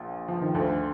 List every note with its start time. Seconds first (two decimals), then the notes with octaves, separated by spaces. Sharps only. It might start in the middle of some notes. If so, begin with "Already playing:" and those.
Already playing: A#1 A#2
0.28 F3
0.41 D#3
0.54 D2 D3